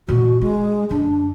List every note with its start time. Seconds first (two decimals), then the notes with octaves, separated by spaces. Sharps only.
0.08 A#2 E3 F#4
0.41 G#3 D4
0.90 F#2 D3 D4